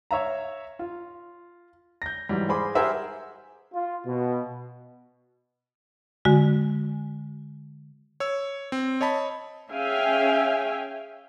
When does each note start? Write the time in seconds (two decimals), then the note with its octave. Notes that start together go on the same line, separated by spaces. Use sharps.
0.11 C#5 E5 F5 A#5
0.79 F4
2.02 G6 A#6
2.29 G#2 E3 F#3 G3
2.49 G#4 C5 B5 C6 D6
2.75 G4 G#4 A#4 C5 E5 F#5
3.74 F4
4.06 B2
6.25 D3 G#3 F#4
8.20 C#5 E6
8.72 C4
9.01 C#5 D#5 A5 B5
9.71 C#4 G#4 E5 F5 G5 G#5